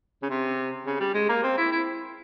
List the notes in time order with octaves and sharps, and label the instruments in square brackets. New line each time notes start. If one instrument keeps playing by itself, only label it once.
[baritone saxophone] C#3
C3
C#3
G3
G#3
A#3
C4
E4
E4